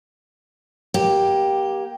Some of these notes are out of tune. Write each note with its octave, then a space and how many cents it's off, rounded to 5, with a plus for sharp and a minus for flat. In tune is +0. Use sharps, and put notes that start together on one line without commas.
A#3 +25 G4 +0